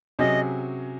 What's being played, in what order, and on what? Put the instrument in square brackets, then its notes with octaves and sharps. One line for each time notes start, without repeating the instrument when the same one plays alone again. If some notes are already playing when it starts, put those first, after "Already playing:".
[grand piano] C3 F#3 C#4 G#4 [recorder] D#5